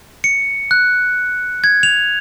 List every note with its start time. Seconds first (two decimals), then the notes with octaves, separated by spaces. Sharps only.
0.24 C#7
0.71 F#6
1.64 G#6
1.83 F7